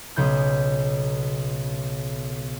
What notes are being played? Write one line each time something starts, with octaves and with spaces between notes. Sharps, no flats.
B1 C#3 G#4 G6